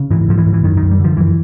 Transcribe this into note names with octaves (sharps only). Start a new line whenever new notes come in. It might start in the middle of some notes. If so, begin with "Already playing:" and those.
Already playing: C#3
G#2 E3
G#2 F3
E3
G#2
E3
F#2 D#3
D#3
F#2
G3
D3 F3
F#2 E3